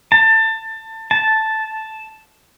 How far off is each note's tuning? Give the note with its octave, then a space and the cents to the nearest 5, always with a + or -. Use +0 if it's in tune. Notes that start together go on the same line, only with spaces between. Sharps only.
A5 +25
A5 -5